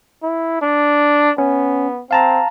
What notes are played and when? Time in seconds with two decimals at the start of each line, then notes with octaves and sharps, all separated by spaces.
0.23 E4
0.61 D4
1.38 B3 C#4
2.11 C4 F5 A5 A#5